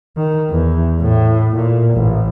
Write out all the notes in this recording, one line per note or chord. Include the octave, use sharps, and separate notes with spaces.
D#3
E2
A2
A#2
A1